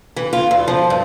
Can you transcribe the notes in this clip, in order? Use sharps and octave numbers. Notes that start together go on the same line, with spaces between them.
E3
F4
E2
F3
G2